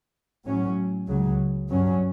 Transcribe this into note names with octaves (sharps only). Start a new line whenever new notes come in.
A2 F#3 C#4
C#2 C#3 F#3
G2 F#3 C#4